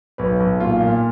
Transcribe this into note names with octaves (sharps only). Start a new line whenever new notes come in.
B1 B4
B1
A#2 F4
A#2